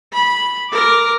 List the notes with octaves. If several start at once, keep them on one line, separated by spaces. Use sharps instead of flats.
B5
A#4 D6